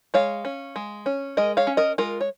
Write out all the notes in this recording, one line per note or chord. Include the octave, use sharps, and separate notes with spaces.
G#3 C#5 F5
C#4
G#3
C#4
G#3 A#4 D#5
C#5 F5
C#4
A#4 D#5
G#3 F4 A#4
C#5